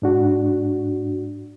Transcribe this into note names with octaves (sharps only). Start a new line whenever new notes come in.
G#2 D4 F#4